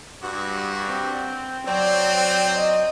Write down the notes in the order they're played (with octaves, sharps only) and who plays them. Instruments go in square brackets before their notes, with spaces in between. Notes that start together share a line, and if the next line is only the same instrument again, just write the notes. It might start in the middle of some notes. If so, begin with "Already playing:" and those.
[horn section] G2 F#4
[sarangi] C4
[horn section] F#3 C4 [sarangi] D5
[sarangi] D#5